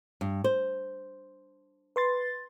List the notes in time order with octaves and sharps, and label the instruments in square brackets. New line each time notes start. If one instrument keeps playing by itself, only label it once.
[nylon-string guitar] G2
C5
[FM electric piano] B4 C6 A6